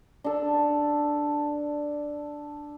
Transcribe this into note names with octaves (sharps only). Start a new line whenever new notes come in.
D4 A4